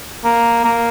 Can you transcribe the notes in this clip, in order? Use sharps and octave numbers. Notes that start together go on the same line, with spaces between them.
A#3
A#3